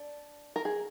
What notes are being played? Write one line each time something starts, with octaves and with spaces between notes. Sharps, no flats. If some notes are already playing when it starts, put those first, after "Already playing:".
Already playing: D4
A#4
G#4